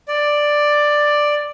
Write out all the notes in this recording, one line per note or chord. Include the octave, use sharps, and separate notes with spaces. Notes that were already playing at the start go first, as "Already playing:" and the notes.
D5